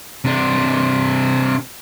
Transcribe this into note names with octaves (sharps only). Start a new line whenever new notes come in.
C3 D4